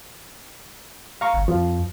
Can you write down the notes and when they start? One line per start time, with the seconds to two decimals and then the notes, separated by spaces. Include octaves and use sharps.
1.21 F5 A#5 C#6
1.34 G1
1.48 F2 F3